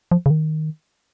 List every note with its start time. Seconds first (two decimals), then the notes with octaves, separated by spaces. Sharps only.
0.11 F3
0.26 C#3
0.30 D#3